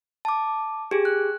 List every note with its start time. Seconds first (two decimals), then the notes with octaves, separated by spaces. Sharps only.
0.25 A5 D6
0.91 G4 G#4
1.05 F#6